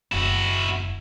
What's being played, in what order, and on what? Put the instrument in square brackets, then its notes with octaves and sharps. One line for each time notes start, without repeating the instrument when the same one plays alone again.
[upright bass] F#1 D#2 [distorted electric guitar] E4 F#4